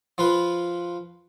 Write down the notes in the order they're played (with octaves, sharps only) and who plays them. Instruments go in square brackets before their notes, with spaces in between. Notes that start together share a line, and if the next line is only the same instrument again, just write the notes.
[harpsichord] F3 F4 B4